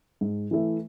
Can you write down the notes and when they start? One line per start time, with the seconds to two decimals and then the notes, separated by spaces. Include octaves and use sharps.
0.21 G#2
0.51 E3 A3 E4